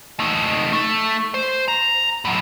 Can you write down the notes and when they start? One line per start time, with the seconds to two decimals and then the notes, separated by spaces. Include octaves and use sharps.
0.20 A3 D#4
0.73 A3 A4
1.34 C5
1.68 A#5
2.25 A2 F#3